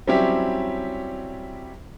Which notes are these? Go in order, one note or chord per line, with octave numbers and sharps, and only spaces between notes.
F#3 G3 C4 C#4 E4 G4